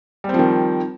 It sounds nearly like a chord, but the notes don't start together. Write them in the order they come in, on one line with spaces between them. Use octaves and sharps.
G3 C4 F3 D#3